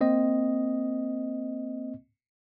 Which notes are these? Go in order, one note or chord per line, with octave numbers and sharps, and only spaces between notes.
A#3 C4 D#5